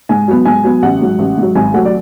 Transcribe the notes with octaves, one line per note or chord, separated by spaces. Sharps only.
G#2 G#5
F#3 B3
G#2 G#5
F#3 B3
A1 F#5
G#2 F#3
A1
G#2 F#3
G#1 G#5
F#3 A3 F#5
D5